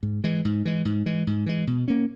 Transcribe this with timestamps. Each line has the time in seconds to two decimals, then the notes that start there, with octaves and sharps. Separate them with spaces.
0.03 G#2
0.24 E3 G#3
0.45 G#2
0.65 E3 G#3
0.85 G#2
1.06 E3 G#3
1.27 G#2
1.46 E3 G#3
1.67 B2
1.88 A#3 C#4